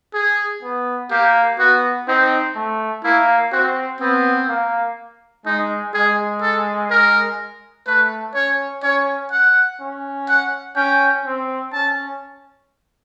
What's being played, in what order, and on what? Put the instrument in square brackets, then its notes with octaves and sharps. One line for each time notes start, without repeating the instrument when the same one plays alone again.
[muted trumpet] G#4
[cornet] B3
[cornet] A#3 [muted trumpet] G4
[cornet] B3 [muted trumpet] F#4
[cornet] C4 [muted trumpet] D#4
[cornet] A3
[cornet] A#3 [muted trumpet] E4
[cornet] C4 [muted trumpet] F#4
[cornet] B3 [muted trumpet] C4
[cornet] A#3
[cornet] G#3 [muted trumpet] D#4
[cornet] G#3 [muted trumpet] G#4
[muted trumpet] A4
A#4
[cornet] A3 [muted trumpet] B4
[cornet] C#4 [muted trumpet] C#5
[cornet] C#4 [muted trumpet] C#5
[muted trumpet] F#5
[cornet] C#4
[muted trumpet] F#5
[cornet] C#4 [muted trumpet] G5
[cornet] C4
[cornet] C#4 [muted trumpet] A5